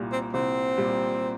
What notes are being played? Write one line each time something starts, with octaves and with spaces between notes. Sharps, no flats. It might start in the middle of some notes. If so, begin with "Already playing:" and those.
Already playing: C2 A#2 G3
C4
C2 C4
A#2 G3